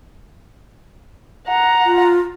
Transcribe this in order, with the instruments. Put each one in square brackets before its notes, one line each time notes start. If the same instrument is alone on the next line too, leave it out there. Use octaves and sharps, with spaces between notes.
[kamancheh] F#5 A#5
[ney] F4